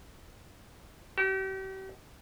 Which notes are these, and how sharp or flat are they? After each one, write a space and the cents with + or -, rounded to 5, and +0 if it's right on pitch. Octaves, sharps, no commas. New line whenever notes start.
G4 -40